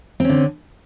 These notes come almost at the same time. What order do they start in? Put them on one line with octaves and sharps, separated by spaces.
C4 C#4 D3